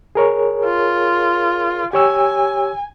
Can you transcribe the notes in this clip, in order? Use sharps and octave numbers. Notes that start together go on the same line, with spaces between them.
G#4 A#4 C#5
F4
G4 C#5 G#5 E6